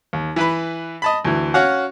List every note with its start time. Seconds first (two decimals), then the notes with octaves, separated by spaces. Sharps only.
0.13 D#2
0.36 E3 B4 B5
1.02 D#5 A5 B5
1.25 D2 E3
1.54 C#4 F#4 F5 F#5